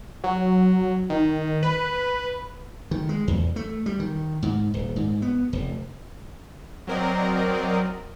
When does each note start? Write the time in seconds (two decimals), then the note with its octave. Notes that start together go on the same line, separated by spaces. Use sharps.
0.24 F#3
1.10 D#3
1.63 B4
2.91 D#3
3.09 G#3
3.28 E2
3.56 A3
3.86 G3
4.00 D#3
4.43 G#2
4.74 D#1
4.96 G#2
5.22 B3
5.53 F1
6.87 F#3 C4 A#4 D5 D#5